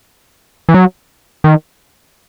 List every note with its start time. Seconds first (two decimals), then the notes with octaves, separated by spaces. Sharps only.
0.69 E3
0.74 F#3
1.44 D#3